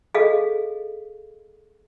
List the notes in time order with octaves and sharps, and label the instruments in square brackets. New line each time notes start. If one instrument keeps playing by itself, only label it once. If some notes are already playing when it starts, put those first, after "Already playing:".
[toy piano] G#4 A4 D#5 F5